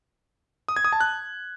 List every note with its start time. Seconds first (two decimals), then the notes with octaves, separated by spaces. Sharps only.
0.68 D#6
0.76 G#6
0.84 D#6
0.93 A5
1.01 F#6